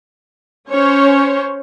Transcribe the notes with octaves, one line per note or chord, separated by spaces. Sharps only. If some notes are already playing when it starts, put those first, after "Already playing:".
C#4 C5 C#5